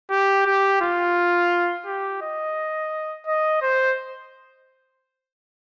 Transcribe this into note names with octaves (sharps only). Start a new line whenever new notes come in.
G4
G4
F4
G4
D#5
D#5
C5